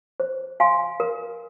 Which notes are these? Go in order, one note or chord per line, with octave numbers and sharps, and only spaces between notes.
C5
F5 G#5 C6
A#4